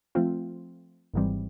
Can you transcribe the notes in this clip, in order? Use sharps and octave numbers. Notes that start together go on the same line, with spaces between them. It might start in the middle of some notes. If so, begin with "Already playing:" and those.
F3 A3 C4 F4
G#1 G#2 E3 G3 C4